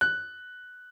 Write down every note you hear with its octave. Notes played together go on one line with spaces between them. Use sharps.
F#6